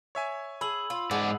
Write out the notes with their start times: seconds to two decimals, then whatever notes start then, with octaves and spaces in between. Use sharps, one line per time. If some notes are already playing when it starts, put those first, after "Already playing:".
0.15 C#5 E5 G#5
0.61 G#4 B5 E6 F#7
0.90 F4
1.11 G#2 G#4 D5 F#5